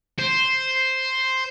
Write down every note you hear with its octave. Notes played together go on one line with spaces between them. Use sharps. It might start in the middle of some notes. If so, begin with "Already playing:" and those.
C5